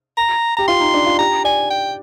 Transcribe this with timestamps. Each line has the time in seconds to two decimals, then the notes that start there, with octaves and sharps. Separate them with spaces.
0.17 A#5
0.57 G4 A#5
0.68 F4 C6
0.80 D#4
0.94 D4
1.06 F4
1.19 G4 A#5
1.44 D5 G#5
1.70 G5